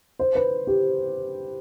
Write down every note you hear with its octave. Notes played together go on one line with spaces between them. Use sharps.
C5
B4
G4